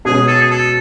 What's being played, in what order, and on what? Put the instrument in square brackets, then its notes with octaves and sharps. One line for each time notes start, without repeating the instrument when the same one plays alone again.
[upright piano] B2 G#3 C#4 [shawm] G#4
[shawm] A4
G#4
A4